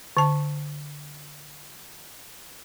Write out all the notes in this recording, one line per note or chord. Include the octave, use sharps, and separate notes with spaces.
D3 A5